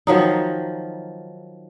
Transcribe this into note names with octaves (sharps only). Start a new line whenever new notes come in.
D#3 F3 F#3 D#4